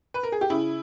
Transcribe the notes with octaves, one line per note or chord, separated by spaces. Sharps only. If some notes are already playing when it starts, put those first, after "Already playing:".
B4
A#4
G#4
G4
C#3 E4